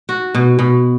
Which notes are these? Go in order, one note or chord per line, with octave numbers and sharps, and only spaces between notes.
F#4
B2
B2